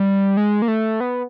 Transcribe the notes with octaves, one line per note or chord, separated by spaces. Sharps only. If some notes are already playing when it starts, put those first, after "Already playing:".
Already playing: G3
G#3
A#3
A3
B3